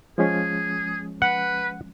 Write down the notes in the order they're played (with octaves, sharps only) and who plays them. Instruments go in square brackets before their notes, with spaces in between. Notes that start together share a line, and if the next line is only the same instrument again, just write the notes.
[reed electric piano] F3 G#3 C#4 [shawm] G#4
[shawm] B4 [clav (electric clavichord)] F#5